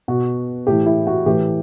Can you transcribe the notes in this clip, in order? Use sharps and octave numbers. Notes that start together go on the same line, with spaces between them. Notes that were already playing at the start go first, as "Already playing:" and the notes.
B2 F#4
A2 E3 G4
E4
F#4
A2 E3 G4